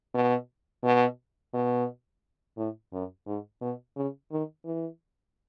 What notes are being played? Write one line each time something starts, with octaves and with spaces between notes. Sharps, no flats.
B2
B2
B2
A2
F#2
G#2
B2
C#3
D#3
E3